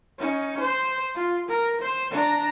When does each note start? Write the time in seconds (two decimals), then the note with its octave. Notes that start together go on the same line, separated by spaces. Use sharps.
0.18 C#4 D#4
0.60 C5
1.15 F4
1.48 A#4
1.81 C5
2.11 D4 A#5